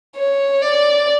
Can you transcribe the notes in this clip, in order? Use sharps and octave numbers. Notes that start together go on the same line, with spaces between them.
C#5
D5